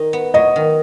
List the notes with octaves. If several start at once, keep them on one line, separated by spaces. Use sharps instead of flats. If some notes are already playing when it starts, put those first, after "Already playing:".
Already playing: D#3 D#4
B3
F#3 D#5
D#3